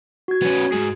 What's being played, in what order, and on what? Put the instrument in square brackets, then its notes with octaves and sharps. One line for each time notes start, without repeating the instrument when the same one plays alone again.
[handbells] F#4 G#6
[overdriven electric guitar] B3 C#4
G#2 G#4